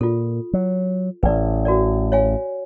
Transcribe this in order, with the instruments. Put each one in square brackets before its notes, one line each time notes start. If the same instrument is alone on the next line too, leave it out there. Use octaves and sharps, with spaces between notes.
[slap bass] A#2 [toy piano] F4 A4
[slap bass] F#3
[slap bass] A1 A2 [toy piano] B4 D5
[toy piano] F#4 A#4 D5
C#5 F5 G#5